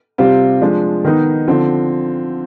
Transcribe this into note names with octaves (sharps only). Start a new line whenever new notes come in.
C3 G3 C4 F4
F3 G#3 D4
D#3 B3 D#4
D3 F3 C4